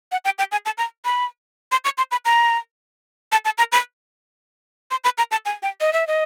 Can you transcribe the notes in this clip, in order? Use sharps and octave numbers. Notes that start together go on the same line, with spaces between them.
F#5
G5
G5
G#5
A5
A#5
B5
C6
C#6
C6
B5
A#5
A5
A5
A#5
B5
C6
B5
A#5
A5
G#5
G5
D#5
E5
D#5